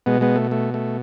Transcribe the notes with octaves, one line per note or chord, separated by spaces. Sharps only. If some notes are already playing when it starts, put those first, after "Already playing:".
B2 G#3 B3
G#3 B3
A3
A3
A3